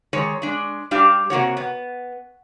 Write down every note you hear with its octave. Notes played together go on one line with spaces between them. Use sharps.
D#3 G#3 C#5
G#3 D4
G3 D4 G4 F5
C3 A#3 F#4 C#5
B3